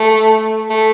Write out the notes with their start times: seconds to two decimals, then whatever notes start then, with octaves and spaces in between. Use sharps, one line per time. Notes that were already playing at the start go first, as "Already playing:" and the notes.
Already playing: A3
0.70 A3